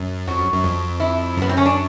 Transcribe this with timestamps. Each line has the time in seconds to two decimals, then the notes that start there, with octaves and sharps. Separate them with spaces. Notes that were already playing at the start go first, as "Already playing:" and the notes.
Already playing: F#2
0.27 F2 F#4
0.40 F#2
0.52 F#2
0.64 F2
1.00 E4
1.37 F#2 B3
1.49 C4
1.57 C#4
1.66 D4